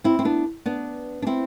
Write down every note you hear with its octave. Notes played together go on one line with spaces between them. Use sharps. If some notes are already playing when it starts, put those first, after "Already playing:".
C4 E4
C4
B3 D4
B3 D4
D4
C4 E4